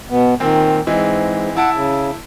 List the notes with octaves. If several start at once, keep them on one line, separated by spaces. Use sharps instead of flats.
B2 B3
A#2 D#3 C4
G#2 E3 G#3 C4
E4 F#5 A5 D7
C#3